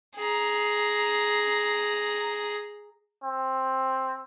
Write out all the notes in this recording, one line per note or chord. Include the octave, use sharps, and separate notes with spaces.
G#4 A#5
C4